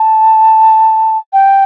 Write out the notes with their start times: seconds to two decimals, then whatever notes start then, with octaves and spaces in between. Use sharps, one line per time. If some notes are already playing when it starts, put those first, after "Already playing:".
Already playing: A5
1.33 G5